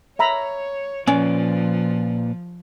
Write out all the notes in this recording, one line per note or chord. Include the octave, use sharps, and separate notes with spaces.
C#5 E5 A#5 B5
A#2 F3 C#4 B4 D5